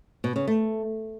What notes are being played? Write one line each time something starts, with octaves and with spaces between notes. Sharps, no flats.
B2
C#3
A3